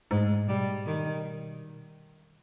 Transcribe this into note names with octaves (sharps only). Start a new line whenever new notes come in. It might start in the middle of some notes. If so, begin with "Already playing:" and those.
G#2 G#3
B2 G3
D#3